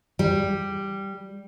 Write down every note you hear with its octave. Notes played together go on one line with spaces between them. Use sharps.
G3